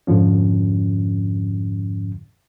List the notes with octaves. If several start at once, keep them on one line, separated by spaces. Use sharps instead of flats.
F2 G#2 D3 F3 C#4